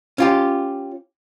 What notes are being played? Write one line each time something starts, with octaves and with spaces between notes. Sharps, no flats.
C#4 F4 G4